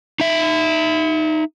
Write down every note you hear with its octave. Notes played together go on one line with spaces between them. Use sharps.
D#4 E5